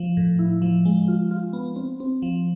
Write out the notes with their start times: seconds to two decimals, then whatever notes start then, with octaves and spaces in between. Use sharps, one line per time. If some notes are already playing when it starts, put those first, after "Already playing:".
Already playing: F3
0.17 A2
0.39 E4
0.62 F3
0.85 G#3
1.08 F4
1.31 F4
1.53 B3
1.76 C4
2.00 C4
2.22 F3